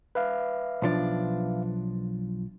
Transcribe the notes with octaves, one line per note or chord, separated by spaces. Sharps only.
B4 E5 F5
B1 F3 D4